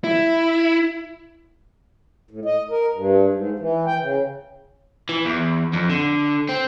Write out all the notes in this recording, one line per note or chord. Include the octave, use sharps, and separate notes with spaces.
E4
A2
D#5
A#4
G2
G#2
E3
G5
C#3
E3
E2
F2
D3
C4